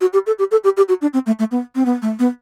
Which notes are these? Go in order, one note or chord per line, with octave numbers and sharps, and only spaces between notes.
F#4
G4
A4
G4
A4
G4
G4
F#4
D4
C4
A3
A3
B3
C4
B3
A3
B3